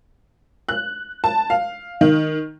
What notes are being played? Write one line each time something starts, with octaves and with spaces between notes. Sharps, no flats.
F#6
A5
F5
D#3